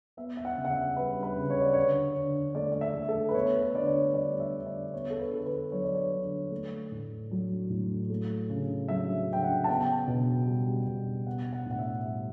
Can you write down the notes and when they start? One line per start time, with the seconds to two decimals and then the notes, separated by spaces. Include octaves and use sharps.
0.17 B3 E5
0.37 E5
0.45 F#5
0.58 C#3
0.65 F#5
0.71 E5
0.96 G3 B4
1.23 B4
1.36 C#3
1.50 C#5
1.61 D5
1.73 D3 C#5
2.16 D3
2.55 A3 D5
2.72 D5
2.81 E5
2.95 A3
3.09 A4
3.29 B4
3.34 B3 C#5
3.60 B4
3.74 D3 D5
3.87 C#5
4.13 G3 D5
4.40 E5
4.54 D3
4.66 D5
4.93 B3 C#5
5.10 A4
5.19 B4
5.33 D3 A4
5.46 B4
5.72 F#3 C#5
5.84 D5
5.95 C#5
6.12 D3
6.51 A3
6.92 A2
7.31 F#3
7.70 A2
8.10 A3
8.49 C#3
8.88 F#3 E5
9.29 C#3 G5
9.42 F#5
9.64 A5
9.68 B3 G5
10.07 B2
10.47 G3
10.87 B2
11.26 B3 F#5
11.53 F#5
11.66 A2
11.71 F#5
11.79 E5
12.05 G3